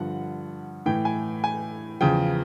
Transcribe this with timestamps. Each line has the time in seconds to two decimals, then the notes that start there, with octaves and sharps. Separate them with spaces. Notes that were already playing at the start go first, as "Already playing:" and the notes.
Already playing: G2 D3 F3 F#5
0.86 A2 E3 G5
1.05 G#5
1.44 G#5
2.01 E2 C#3 F3 G5